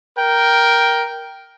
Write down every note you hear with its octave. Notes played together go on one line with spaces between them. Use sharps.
A#4 G5